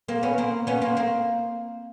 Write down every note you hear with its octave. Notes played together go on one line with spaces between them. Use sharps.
A#3 C4
B3 C#4
A#3 C4
B3 C#4
A#3 C4
A#3 C4